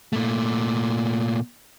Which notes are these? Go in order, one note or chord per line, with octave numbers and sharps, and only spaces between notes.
A#2 A3